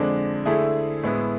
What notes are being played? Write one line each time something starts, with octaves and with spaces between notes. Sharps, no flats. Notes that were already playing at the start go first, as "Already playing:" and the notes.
Already playing: F2 D3 G#3 D4
D3 A3 E4 G#4
A2 G#3 B3 E4